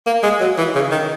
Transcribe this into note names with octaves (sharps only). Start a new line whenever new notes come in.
A#3
G#3
F#3
E3
C#3
D#3